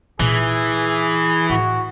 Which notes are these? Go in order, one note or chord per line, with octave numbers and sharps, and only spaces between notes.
A#2 E3 D#4 G#4
A2 F#4